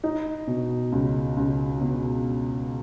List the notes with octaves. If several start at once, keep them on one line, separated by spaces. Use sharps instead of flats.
D#4
B2
C#2
C#2
B2